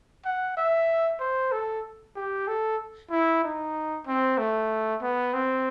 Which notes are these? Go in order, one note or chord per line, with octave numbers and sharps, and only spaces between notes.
F#5
E5
C5
A4
G4
A4
E4
D#4
C4
A3
B3
C4